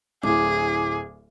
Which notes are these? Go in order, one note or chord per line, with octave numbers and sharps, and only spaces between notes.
D1 A2 G#4 D6